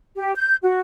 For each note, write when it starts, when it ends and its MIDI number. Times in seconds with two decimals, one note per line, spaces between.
0.16 0.33 67
0.35 0.55 91
0.62 0.79 66